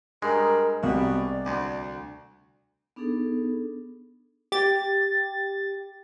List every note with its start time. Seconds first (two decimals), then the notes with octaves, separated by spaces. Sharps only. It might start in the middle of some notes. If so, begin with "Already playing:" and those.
0.22 G2 G#3 A#4
0.83 C2 B2 G4 D5
1.46 D2
2.96 B3 D4 D#4 G#4 A4
4.52 G4 A6